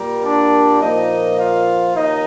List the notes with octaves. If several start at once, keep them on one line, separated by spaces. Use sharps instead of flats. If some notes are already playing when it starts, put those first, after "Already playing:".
Already playing: A#2 G3 A#3 A#4
D4 D5
A#2 F3 A#3 D#4 D#5
F4 F5
D#2 D#4 D#5